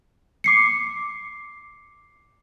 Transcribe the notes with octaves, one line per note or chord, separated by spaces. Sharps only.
D6 C7 C#7